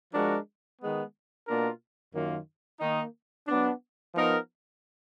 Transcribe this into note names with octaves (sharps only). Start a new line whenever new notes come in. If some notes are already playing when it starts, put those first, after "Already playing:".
F3 G#3 D4 F#4 A#4
D#3 G#3 B3
B2 A#3 D4 F4 A#4
F#2 D#3 F#3 A#3 F4
D#3 A#3 D#4
F#3 B3 D4
F3 B3 D#4 A#4